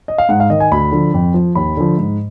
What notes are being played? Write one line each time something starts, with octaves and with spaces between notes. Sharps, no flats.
D#5
F5
G#2 F#5
F5
D#3 D#5
G#5
D2 B5
D3 F3
F2
F3
D#2 B5
D3 F3
G#2